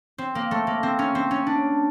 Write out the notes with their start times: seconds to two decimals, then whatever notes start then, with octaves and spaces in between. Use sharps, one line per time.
0.18 C4
0.35 A#3
0.51 A3
0.67 A#3
0.83 C4
0.99 C#4
1.15 C4
1.31 C#4
1.47 D4